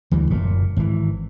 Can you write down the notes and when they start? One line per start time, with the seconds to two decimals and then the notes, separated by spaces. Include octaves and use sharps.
0.11 D2 E3 G3
0.30 F#1 A#2
0.77 G#1 E3